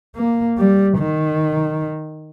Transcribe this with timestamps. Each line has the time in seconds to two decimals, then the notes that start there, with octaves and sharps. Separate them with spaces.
0.16 A#3
0.58 G3
0.99 D#3